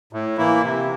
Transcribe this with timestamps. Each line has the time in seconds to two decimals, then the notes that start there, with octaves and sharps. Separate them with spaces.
0.13 A2
0.37 E3 A#3 E4
0.63 C3